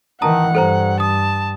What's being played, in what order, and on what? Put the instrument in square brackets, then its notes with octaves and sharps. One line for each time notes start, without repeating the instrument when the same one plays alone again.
[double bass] D#3 E3 [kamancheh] F#5 [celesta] A5 A#5 D#6
[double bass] G2 [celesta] A4 C5 A#5
[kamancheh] A5 [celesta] D#6